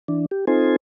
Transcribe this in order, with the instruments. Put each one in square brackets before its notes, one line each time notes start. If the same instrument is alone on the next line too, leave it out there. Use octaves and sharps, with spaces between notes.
[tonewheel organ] E3 D4
G4
C4 D#4 F4 A4 C5 G#5